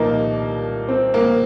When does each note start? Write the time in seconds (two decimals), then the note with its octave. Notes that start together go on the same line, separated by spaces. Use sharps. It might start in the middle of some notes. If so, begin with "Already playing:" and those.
Already playing: C2 A#2 F3 A#3 D#4
0.89 C4
1.14 A#3